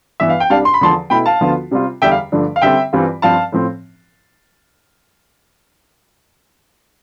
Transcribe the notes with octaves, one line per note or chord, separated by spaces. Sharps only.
G2 E3 B3 E5
F5
G5
C2 C3 G3 D4 F5 A5
C6
B5
E2 D3 F3 A5 C6
B2 A3 E4 G5 B5
F5 A5
D2 D3 F3 B3 F4
C3 G3 C4 F4
E2 D3 G3 E5 G5
F5
G2 D3 F3 A3 D4
F5
D3 G3 C4 E5 G5
G2 E3 G3 C4 F4
G2 F3 C4 F5 A5
A2 F3 C4